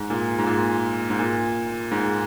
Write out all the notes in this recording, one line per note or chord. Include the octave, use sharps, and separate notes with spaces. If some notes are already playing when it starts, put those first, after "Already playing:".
Already playing: G#2
A#2
G#2
A#2
G#2
A#2
G#2